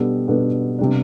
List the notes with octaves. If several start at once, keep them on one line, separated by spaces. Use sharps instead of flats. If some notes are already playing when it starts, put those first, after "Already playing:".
Already playing: B2 G3 B3 D4 A4
B2 G3 B3 D4 A4
C3 G3 B3 D4